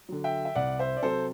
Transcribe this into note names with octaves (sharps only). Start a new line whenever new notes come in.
D3 F#3
E5 G5
E5
C2 D5 F#5
C5 E5
D5
C3 F#3 A4 C5